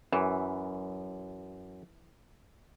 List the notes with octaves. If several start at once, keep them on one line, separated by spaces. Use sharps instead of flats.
F#2 E3